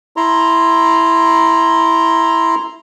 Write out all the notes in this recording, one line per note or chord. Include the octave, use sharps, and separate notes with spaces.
E4 A#5 C6